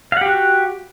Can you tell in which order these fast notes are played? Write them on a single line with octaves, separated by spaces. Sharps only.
F5 F#5 G4 F#4